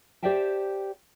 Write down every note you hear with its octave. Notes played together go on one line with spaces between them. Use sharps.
G4 C5 D5 E5 G5 A5